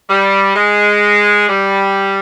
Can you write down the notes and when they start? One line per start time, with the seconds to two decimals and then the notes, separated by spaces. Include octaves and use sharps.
0.10 G3
0.56 G#3
1.49 G3